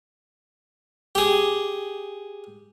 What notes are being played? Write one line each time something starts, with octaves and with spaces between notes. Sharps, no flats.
G4 G#4